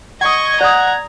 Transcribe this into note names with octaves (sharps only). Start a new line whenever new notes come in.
D#5 F#5 C#6 D#6 G#6
D5 F#5 A#5 D#6